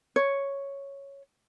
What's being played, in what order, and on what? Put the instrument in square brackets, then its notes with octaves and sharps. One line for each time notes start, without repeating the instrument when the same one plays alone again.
[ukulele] C#5